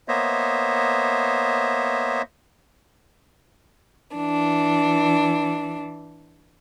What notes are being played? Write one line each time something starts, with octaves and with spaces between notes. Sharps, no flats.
A#3 B3 C5 C#5 D#5 E5
E3 D4